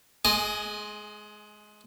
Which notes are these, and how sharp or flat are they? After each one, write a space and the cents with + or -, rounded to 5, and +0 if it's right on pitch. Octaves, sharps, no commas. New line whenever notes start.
G#3 +20 D#5 -15 G#5 +0